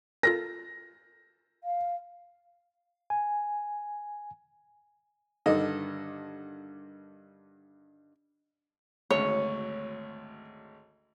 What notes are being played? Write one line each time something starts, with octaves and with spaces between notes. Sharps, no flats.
F4 A4 A#4 A#6
F5
G#5
G2 D3 D#3 A4 D#5
G#1 D2 C#4 C#5